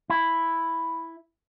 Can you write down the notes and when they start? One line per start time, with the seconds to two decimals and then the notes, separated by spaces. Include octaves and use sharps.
0.10 E4